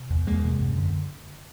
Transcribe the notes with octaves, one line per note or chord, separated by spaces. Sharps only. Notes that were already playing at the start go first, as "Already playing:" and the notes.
Already playing: C3
E2
E2 G#3 A#3
C3
F#2
D3